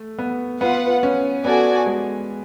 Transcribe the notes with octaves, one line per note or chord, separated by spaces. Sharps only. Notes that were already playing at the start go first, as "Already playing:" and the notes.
Already playing: A3
B3
B3 F4 B4 F#5
C#4
B3 F#4 A4 D5 G#5
G#3